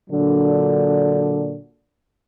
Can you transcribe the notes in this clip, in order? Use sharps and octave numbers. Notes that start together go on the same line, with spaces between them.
A#2 D3 F#3 D4